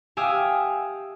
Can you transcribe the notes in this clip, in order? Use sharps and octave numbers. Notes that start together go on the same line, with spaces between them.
G4 E5 F5 G#5 D#6